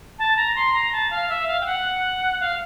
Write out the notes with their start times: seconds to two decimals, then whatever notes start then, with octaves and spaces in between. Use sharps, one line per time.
0.19 A5
0.37 A#5
0.56 C6
0.73 A#5
0.92 A5
1.11 F5
1.29 E5
1.48 F5
1.61 G5
1.66 F#5
2.41 F5